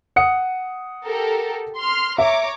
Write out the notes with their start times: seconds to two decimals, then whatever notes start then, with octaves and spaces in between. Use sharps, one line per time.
0.16 F#5 D#6 C#7
1.06 G4 A4 A#4
1.78 C6 F6
2.18 C#5 E5 A#5 D6